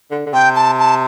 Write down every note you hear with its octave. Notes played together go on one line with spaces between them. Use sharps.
D3
D3
C3 G5
A5
A5